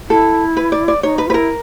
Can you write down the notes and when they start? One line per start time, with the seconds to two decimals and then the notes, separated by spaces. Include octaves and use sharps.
0.09 E4 A4
0.57 B4
0.72 D5
0.88 D5
1.03 D#4 C#5
1.18 B4
1.27 F4
1.30 E4 A#4 B4